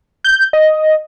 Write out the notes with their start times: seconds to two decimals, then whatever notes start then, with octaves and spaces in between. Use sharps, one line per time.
0.24 G6
0.53 D#5